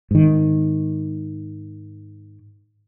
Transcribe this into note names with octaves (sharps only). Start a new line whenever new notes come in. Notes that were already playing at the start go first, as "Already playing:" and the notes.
G#2 D#3